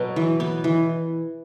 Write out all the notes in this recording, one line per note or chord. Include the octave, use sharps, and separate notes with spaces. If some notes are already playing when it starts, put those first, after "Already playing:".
Already playing: B2 F#3 B3
E3
B3
E3